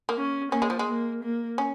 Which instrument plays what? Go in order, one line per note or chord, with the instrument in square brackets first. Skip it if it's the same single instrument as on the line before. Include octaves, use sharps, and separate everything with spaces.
[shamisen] A#3
[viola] C#4
[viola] A#3 [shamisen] C#4
[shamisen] G#3
F3
G#3
[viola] A#3
A#3
[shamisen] C#4